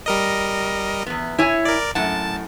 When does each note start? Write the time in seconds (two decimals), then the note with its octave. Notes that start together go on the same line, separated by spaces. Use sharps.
0.06 G3 A#4 D#5
1.06 E2 B3
1.38 E4 C#5 G#5
1.65 A#4 D5
1.95 F#2 A2 F#5 A5